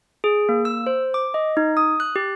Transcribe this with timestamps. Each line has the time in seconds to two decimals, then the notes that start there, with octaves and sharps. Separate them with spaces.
0.24 G#4
0.49 A#3
0.65 E6
0.87 C5
1.14 D6
1.34 D#5
1.57 D#4
1.77 D#6
2.00 F#6
2.16 G4